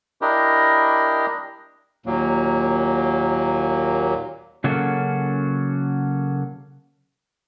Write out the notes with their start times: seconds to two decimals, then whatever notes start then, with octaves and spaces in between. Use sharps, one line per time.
0.21 D4 E4 G4 A#4 D#5
2.06 D#2 A#2 F#3 A#3
4.64 C#3 F#3 A#3 C#4 F#4 A4